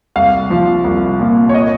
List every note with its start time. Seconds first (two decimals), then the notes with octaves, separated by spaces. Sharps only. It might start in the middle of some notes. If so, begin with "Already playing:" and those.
0.16 C2 F5
0.50 F3
0.84 C2
1.20 A#2
1.49 C#5
1.54 D#5